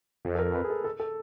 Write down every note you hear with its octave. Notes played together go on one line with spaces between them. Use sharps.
F2
A4
A#4
B4
G#4
A4
A4
A4